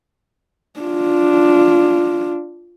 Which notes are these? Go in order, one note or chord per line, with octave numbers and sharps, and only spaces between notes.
D4 F4